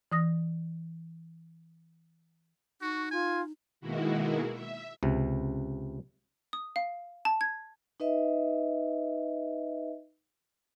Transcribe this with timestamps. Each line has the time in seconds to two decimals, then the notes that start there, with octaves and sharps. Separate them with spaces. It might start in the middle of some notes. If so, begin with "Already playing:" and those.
0.12 E3 D#6 A#6
2.81 D#4 F#4 C#6
3.11 F4 G#5
3.80 B2 D#3 G#3 A#3 E4 F#4
4.51 E5
5.03 C#2 C3
6.53 D#6
6.76 F5
7.25 A5
7.41 G#6
8.00 D#4 B4 D#5 E5